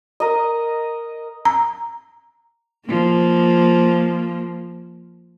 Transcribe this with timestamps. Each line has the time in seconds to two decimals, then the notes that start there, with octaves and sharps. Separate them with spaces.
0.20 A#4 D#5
1.45 A#5
2.86 F3 A#3